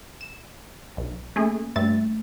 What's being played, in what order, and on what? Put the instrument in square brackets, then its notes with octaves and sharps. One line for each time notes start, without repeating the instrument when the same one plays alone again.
[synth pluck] E7
B1
[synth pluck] A3 G#4 [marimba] A#3 C#4
[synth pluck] G2 E5 A6 [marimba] A3